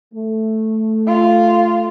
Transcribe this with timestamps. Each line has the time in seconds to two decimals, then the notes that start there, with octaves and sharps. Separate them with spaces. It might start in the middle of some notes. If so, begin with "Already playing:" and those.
0.14 A3
1.07 F4